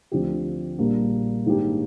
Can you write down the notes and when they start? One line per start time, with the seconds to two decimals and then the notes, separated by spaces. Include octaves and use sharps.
0.11 D2 D3 F3 C4 G4
0.78 A#1 A#2 G3 A#3 D4
1.46 G#2 D#3 A#3 D4 G4